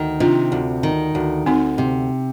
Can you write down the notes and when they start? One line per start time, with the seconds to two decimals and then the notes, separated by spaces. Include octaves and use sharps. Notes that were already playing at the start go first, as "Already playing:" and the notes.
Already playing: D2 D#3
0.20 C3 D4 F4
0.52 D2
0.83 D#3
1.15 D2
1.46 D2 C4 D#4
1.78 C3